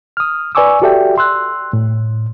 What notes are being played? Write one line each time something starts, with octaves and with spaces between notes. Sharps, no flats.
D#6 F6
B4 D5 G#5 C#6 D6 E6
F#4 G4 A4 D5 E5 G5
C6 E6 F#6
A2